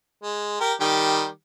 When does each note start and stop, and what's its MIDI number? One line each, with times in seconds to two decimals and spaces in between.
0.23 0.56 56
0.60 0.73 67
0.60 0.73 70
0.81 1.26 51
0.81 1.26 55
0.81 1.26 67